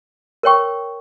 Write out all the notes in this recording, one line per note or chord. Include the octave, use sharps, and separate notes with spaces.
A#4 C#5 G5 C#6